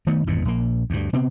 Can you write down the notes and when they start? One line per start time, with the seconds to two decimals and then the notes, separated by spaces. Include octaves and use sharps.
0.07 D#3 A3 B3
0.27 G#1 E2 G2 B2
0.45 A#1 A#3
0.90 D2 G2
1.13 C3 B3 C4